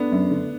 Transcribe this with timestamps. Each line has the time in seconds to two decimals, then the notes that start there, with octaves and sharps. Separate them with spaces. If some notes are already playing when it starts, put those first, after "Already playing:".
Already playing: A3 B3 D4
0.12 F#2
0.31 D3